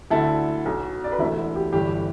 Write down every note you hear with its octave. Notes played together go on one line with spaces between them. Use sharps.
D2 D3 E4 A4
B1 B2
D5
B4
E1 D2 D3 E4 A4
E4
G4
G1 G2 E3 G4